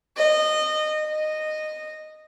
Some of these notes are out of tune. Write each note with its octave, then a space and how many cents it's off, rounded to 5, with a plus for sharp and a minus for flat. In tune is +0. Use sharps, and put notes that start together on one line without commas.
D#5 -20
D#5 -15